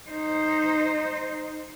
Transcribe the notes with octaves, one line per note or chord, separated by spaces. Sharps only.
D#4 C5